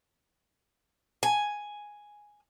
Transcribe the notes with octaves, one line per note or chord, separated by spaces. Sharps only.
G#5